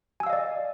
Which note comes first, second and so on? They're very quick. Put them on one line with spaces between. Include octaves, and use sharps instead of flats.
G#5 E6 F5 D#5 D5